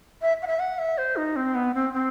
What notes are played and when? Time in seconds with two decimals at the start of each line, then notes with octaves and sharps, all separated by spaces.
0.22 E5
0.42 F#5
0.47 E5
0.59 F#5
0.79 E5
0.98 C5
1.16 D#4
1.36 C4
1.55 B3
1.74 C4
1.93 C4